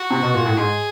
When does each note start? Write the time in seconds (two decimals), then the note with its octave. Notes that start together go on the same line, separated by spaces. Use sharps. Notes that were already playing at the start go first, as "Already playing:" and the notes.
Already playing: F#4
0.11 C3
0.23 B2
0.34 A#2
0.46 A2
0.57 G#2 G#4